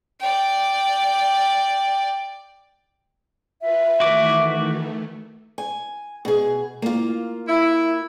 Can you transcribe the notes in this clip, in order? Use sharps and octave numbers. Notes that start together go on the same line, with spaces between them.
D5 G5
F4 B4 E5
D#3 E3 A3 F#4 D6
G#5
B2 G#4
A#3 F4
E4